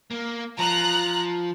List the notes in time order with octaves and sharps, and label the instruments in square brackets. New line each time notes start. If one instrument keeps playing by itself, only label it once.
[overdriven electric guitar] A#3
[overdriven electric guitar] F3 [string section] A#5 F#6